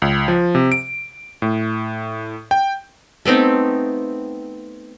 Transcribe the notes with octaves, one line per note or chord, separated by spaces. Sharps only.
C#2
F3
C3
D7
A2
G5
A3 B3 C4 D#4